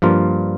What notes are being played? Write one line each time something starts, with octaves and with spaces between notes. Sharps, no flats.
G2 F3 A#3 F4